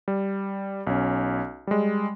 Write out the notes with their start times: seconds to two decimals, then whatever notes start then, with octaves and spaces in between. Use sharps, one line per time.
0.08 G3
0.87 B1 C#4
1.67 G3 G#3